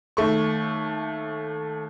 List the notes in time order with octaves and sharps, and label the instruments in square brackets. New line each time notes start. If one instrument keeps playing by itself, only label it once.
[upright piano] D#2 A3 C#6